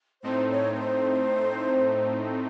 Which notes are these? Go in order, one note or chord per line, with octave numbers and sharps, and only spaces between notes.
A2 A3 C4 D#4 C5
C#5
A#4
C5